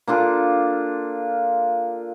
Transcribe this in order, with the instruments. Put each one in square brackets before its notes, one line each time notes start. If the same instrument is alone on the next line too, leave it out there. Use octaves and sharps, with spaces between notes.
[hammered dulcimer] A#3 D4 F4 A4